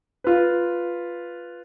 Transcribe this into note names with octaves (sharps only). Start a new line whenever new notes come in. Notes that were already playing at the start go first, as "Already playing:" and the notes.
F4 B4